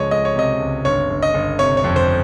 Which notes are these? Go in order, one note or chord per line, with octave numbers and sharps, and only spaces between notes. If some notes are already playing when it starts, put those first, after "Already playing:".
Already playing: C#2 F3 G#3 C#5 D#5
G#3 D#5
C#5
C3 D#5
C#2
G1 C#5
G1
D#5
G1
C3 C#5
C#5
F2
C5